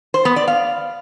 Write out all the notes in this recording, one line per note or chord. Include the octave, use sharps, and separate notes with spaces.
C5
B3
D5
F5